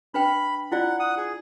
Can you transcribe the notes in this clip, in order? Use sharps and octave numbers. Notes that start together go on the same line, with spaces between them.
D4 B4 G5 B5
E4 F4 D5 F#5
F#5 D#6
G#4